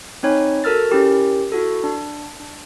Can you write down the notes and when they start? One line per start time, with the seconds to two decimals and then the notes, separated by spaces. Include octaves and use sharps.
0.23 C4 D#4 C#5 G#5 B5
0.64 F#4 A4 A#4 E6 F6 A6
0.90 C#4 E4 G4 A#4
1.52 E4 F#4 A4
1.84 D4
2.40 D4